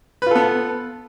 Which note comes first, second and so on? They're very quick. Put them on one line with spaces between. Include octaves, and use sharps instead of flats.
B4 F4 A4 B3